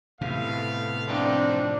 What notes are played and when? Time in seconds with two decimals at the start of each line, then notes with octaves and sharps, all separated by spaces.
0.21 A2 C3 A3 B3 F5
1.08 F3 C4 D4 D#4